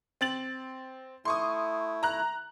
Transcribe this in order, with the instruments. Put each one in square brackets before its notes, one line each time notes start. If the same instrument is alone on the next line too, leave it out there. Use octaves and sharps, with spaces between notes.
[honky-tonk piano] C4 A6 F#7
[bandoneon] A3 E4 [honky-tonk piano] C6 C#6 D#6
[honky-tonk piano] A#5 F#6